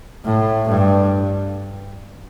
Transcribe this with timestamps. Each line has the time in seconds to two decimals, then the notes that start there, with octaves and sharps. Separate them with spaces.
0.25 A2
0.69 G2